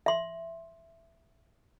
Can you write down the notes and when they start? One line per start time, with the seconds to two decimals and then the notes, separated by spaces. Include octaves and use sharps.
0.06 E5 C6